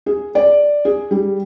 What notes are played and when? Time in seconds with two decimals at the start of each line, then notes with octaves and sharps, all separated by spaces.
0.06 G#4
0.35 D5
0.85 G#4
1.11 G3